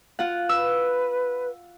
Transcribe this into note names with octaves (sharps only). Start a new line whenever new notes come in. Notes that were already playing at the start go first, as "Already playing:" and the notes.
F4 F#5
B4 E6